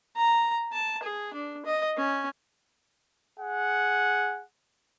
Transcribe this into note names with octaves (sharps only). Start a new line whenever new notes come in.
A#5
A5
G#4
D4
D#5
C#4
G#4 F#5